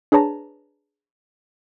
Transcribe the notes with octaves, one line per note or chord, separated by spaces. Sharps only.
D4 G#4 B4 C#5 A5 A#5